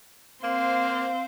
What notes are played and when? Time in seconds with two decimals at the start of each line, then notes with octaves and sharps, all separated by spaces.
0.44 A#3 C4 C5 F5